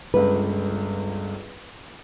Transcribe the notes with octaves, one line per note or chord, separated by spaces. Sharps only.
G1 C#2 B4